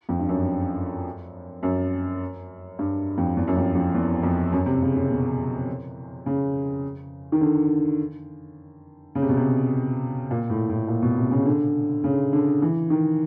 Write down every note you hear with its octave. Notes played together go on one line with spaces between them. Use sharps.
F2
G2
F#2
F#2
G2
F2
E2
F#2
F2
F2
E2
F2
F#2
C3
C#3
C#3
B2
C#3
D#3
D3
C#3
C3
B2
C3
A#2
A2
A2
A#2
B2
C3
C#3
D3
C#3
D3
E3
D#3